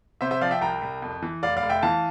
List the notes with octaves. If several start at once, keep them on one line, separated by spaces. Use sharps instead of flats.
C3 C5 E5
C5 E5
F3 D5 F5
E5 G5
C2 G5 A#5
C2
F2
E3
F1 D5 F5
D5 F5
F1
E5 G5
E3 F5 A5